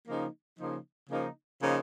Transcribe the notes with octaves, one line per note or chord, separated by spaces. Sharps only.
C#3 F3 A#3 D#4
C#3 F3 A#3 D#4
C#3 F3 A#3 D#4
C#3 F3 A#3 D#4